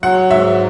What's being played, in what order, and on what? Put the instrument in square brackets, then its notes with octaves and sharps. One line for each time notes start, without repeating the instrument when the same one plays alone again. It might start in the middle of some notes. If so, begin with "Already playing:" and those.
[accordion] F#3 [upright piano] F#5
[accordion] G#2 [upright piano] E5